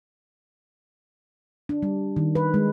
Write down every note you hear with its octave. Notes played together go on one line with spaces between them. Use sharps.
D4
G3
D#3
B4
G#3